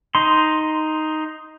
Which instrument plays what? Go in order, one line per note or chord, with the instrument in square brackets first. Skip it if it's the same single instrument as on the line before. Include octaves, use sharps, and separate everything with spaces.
[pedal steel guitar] D#4 C6